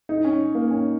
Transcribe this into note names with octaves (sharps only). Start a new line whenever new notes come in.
D#4
C#4
A#3
C#4